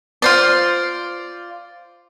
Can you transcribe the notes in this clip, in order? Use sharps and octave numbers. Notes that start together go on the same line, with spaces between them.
F4 C5 D5